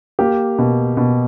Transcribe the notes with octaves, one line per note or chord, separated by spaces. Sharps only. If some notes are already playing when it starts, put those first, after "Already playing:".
A#3 G4
B2
B2